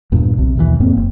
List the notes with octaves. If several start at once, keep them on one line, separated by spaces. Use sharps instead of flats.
E2 G2 A#2
B1 C3
D#2 B2 D#3 E3
F2 A2 A#3 C4
F#1